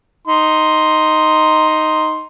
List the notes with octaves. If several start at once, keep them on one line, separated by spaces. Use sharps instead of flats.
D#4 C6